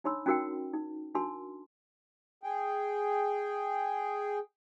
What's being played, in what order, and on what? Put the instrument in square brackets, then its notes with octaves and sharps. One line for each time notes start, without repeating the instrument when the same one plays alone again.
[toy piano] D4 D#4 C#5 B5 C6 E6
C#4 D#4 F#4 A#4 F#5 G5
D#4
D4 F#4 A#4 A5 C6
[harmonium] G#4 G5